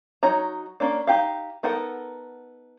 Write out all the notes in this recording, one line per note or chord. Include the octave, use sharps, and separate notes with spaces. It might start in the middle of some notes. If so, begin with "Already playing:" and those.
F#3 D#4 C#5 A#5
A#3 C#4 D4
D#4 G4 F5
B3 D#4 A4 A#4 F#5